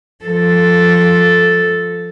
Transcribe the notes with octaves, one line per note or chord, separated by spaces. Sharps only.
F3 A4